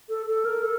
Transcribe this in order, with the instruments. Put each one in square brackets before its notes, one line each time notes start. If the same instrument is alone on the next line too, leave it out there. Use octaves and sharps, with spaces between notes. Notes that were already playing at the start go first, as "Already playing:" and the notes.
[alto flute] A4
A4
A#4
A4